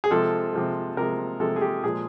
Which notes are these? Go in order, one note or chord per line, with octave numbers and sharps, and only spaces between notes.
G#4
C3 F3 G#3 A4
C3 F3 G#3
C3 F3 G#3 A#4
C3 F3 G#3 A4
G#4
G4
A#2 F3 G#3 G#4